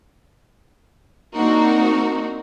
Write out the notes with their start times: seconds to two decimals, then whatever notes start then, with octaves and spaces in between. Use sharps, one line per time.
1.36 A#3 C4 D4 D#4 F#4 A#4